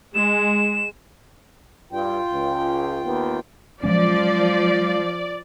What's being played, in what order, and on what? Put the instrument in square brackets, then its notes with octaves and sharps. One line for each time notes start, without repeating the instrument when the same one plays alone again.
[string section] G#3 [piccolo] E7
[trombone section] G2 [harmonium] F4 G5
[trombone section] C#2
D#2 B3
[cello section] F3 [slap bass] F#3 G#3 C#4 [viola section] D5